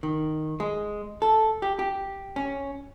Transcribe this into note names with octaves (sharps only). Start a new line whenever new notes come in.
D#3
G#3
A4
G4
G4
C#4